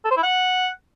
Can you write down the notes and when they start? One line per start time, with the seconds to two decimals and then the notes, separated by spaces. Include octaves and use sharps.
0.05 A4
0.11 C5
0.17 E4
0.23 F#5